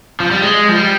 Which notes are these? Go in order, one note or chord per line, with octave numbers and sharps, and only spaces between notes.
F3
G3
G#3
F3
G3